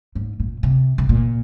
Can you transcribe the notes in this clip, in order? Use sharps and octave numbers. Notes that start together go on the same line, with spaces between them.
G#2
A#2
C3
C3
A#2